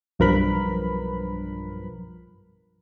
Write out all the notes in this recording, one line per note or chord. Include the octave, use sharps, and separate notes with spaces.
B1 G2 F3 A#4 B4 B5